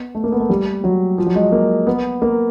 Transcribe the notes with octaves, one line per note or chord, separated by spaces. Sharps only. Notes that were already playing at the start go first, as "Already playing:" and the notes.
Already playing: B3
A3
A#3
B3
A3
G3
F#3
F3
F#3
G#3
A#3
B3
A#3